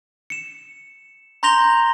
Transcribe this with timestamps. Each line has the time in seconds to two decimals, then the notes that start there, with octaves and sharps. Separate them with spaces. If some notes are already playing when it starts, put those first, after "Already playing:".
0.30 C#7 E7
1.43 A#5 C6 G6 A#6 F7 G7